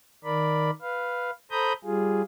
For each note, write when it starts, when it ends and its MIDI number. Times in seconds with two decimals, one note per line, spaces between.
0.24 0.70 51
0.24 0.70 70
0.24 0.70 74
0.24 0.70 83
0.82 1.31 71
0.82 1.31 77
1.51 1.73 69
1.51 1.73 72
1.51 1.73 82
1.51 1.73 83
1.51 1.73 87
1.51 1.73 91
1.84 2.22 55
1.84 2.22 65
1.84 2.22 68